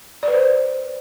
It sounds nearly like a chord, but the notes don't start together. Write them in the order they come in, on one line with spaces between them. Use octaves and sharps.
D5 B4 C5